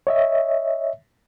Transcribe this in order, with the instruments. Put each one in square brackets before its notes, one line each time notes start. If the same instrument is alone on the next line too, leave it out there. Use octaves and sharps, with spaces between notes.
[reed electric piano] C#5 D#5 E5